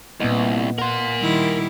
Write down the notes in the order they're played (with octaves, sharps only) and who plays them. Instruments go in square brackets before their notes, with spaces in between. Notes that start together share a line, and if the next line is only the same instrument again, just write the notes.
[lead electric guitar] C2 [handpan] A#2 B3 D#5
[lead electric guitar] A#4 C6 [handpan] F#5
[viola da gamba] D#3 G3 E4